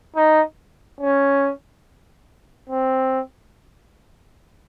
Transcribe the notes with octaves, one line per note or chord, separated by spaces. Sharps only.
D#4
C#4
C4